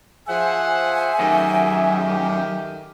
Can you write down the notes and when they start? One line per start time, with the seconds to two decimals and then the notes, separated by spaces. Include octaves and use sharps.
0.27 F3 G#4 C5 E5 F#5 G#5
1.19 F#2 D#3 A3 G4